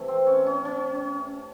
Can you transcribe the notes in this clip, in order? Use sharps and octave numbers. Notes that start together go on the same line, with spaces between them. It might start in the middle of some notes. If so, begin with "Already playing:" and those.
Already playing: C3 E3 A3
C4
C#4
C#4
C#4